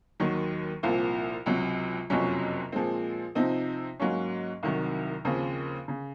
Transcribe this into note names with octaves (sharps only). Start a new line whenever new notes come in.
D#2 D#3 F#3
C2 A#2 F3 C4
C#2 C3 F#3
F#1 F2 C3 F#3 C#4
A#2 F3 G#3 C4
C3 F3 C4 D#4
G#2 F#3 A#3 C#4
C2 C3 D#3 F#3
D#2 C#3 F3 C4
C#3